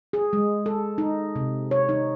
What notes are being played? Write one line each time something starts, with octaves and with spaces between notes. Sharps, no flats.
G#4
G#3
A4
D#4
C3
C#5
D#4